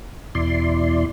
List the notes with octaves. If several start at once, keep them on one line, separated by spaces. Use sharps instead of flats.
E2 B2 E4 D5 C6